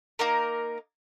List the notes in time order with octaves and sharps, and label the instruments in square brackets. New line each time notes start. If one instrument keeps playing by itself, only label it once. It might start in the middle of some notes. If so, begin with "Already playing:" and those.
[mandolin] A#3 D#4 A#4